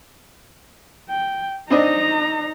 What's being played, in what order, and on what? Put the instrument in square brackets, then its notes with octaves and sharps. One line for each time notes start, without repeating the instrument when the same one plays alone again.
[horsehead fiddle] G5
[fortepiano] C4 D4 D#5 [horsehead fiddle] D#4 A#5